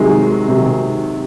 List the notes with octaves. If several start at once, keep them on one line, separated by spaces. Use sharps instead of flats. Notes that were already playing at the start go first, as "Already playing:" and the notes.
Already playing: C3 D#3 F#3 G#3
C3 D#3 F#3